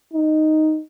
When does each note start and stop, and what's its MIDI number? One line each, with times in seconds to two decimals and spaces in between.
0.14 0.80 63